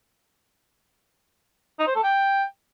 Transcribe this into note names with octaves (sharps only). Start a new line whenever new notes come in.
D#4
C5
A4
G5